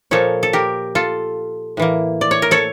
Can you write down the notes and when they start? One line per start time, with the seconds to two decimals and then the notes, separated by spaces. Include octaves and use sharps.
0.11 A#2 F3 A#3 A4 C#5
0.43 A4
0.53 G4 A#4
0.95 F4 A4
1.77 A2 E3 A#3
2.21 D5
2.31 C#5
2.42 A#4
2.51 A4 C#5